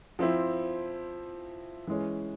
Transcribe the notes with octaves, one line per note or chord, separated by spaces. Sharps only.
F3 C4 E4
E3 G#3 C#4